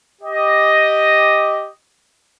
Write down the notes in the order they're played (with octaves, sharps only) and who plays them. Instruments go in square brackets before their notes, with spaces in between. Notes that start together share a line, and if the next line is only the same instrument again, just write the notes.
[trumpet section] G4 D#5